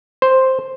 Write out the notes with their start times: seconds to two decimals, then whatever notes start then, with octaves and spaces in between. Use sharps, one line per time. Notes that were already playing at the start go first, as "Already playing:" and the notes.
0.22 C5